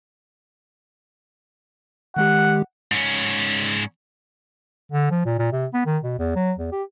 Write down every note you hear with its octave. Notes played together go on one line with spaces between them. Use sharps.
D#3 G#3 G4 F#5
G#2 C#4
D3
F3
A#2
A#2
C3
B3
D#3
B2
E2
F#3
E2
G4